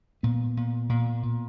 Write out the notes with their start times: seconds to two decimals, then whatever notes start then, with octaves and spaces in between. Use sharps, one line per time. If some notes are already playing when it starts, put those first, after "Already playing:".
0.23 A#2 B3
0.57 A#2
0.89 A#2
1.23 A#2